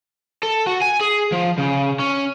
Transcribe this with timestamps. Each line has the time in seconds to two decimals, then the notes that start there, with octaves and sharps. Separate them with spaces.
0.43 A4
0.67 F#4
0.81 G#5
1.01 G#4
1.32 F3
1.58 C#3
1.99 C#4